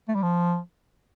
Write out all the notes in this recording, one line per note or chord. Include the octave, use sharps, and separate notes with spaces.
A3
G3
F3